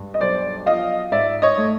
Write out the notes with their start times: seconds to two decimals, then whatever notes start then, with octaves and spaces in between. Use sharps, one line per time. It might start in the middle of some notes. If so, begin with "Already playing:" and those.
Already playing: G2 G#3
0.14 D#5
0.20 B1 C5 D5
0.66 F3 D#5 F5
1.12 G#2 D5 E5
1.42 C#5 D#5
1.58 A3